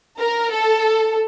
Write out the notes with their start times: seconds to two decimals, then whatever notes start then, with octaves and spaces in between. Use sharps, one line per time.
0.19 A#4
0.50 A4